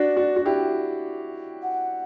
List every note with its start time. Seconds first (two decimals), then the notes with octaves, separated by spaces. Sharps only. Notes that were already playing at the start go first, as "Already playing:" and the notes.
Already playing: D4 F#4 D5
0.17 D4 F#4
0.36 F#4
0.46 E4 G4
1.62 F#5